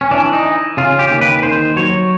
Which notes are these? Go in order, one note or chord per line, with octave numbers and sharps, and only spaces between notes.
C#4
E3 D4
D#4
E3
C#3 F4
G4
D#2
B4
D#3 C5
F#3 C#5